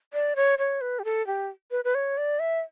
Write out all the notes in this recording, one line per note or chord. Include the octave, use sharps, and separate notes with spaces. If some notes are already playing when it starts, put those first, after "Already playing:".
D5
C#5
C#5
B4
G4
A4
G4
B4
B4
C#5
D5
E5